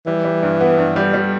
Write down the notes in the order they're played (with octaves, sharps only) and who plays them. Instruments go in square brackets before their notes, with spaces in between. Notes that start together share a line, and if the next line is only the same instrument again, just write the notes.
[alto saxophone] E3 [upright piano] G3
[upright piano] G3
G2
B3
G2
G3
G3